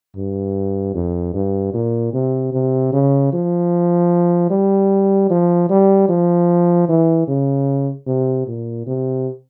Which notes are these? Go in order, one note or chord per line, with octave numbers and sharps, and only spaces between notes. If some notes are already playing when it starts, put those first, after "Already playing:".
G2
F2
G2
A#2
C3
C3
C#3
F3
G3
F3
G3
F3
E3
C#3
C3
A#2
C3